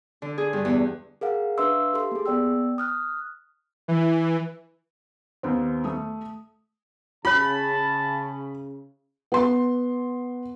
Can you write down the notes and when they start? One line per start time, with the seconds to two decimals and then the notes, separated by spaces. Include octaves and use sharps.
0.22 D3
0.38 G#4
0.53 G2
0.65 E2
1.21 G#4 A#4 F5 F#5
1.58 D4 B4 E5 F5 C6 E6
1.94 G4 A4 C6
2.12 A#3 G#4
2.26 B3 D5 G5 E6
2.78 D#6 F6 F#6
3.88 E3
5.43 D#2 B3 C4
5.84 A3 D#6
7.25 C#3 F4 C#5 A5 B5
9.32 B3 C6